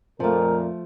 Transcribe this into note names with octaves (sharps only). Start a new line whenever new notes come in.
F2 A#2 F3 A3 A#4